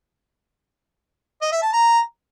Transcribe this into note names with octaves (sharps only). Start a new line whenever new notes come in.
D#5
E5
A5
A#5